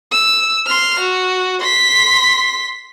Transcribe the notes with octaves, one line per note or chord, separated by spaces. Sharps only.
E6
C6 F6
F#4
C6 B6